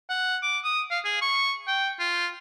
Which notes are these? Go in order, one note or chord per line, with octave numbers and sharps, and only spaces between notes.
F#5
D6
D#6
F5
G#4
C#6
G5
F4